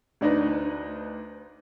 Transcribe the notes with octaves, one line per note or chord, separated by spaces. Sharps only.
D2 D4 D#4 B4